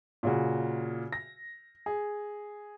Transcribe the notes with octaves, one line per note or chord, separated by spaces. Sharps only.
A#2 C#3 F#4
A#6
G#4